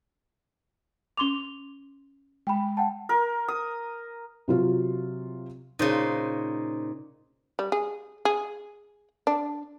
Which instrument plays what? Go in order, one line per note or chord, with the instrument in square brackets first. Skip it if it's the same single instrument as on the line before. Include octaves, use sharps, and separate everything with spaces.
[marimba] C#4 C6 D6 [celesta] F7 G7
[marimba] G#3 [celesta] G5 B5
[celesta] F#5 G5 A5
[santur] A#4
D#6
[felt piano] C3 F#3 F4
[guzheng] A#2 C#3 [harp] D#4 C5
[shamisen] G3
G#4
G#4
D4